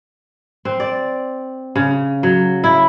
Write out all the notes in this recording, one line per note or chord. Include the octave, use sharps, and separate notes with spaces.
C4
D5
C#3
F#3
E4